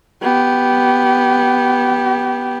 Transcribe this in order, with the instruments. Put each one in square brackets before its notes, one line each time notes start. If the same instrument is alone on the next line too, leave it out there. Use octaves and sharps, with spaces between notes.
[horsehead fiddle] B3 G4